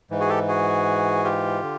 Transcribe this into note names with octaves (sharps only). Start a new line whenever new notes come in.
G#2 E3
F#4 G#4
G4 A4
F#4 G#4
F4 G4
D3